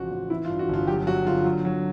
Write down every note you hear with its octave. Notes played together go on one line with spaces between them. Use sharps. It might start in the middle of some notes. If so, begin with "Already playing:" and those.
Already playing: A1 C#3 F3 F#4
A1
E3 E4
F4
G2
F#4
G1 F4
F#3 G4
F#3 F#4
D3 F4
F#3
F#3